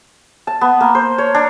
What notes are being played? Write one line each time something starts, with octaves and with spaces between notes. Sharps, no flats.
A5
B3
A#3
C5
C#5
D4